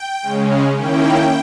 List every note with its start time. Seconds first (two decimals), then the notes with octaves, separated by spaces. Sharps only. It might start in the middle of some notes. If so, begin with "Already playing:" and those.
Already playing: G5
0.23 C#3 G#3 C#4
0.75 D#3 A#3 C#4 E4 G5